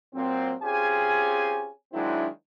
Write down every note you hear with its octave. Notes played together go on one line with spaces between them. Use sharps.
A#2 F#3 A#3 C4
C4 C#4 F4 G4 G#4 G#5
D#3 F#3 G#3 C4 D4 E4